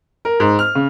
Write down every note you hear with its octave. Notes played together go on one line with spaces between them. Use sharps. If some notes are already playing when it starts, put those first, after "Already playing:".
A#4
G#2
F6
C#3